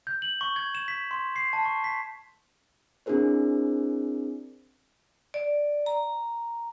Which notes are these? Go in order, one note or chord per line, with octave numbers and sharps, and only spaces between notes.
G6
F#7
C#6
G#6
E7
B6
C6
C7
A5
C#6
B6
C4 D4 E4 G#4 A#4 C5
D5
A#5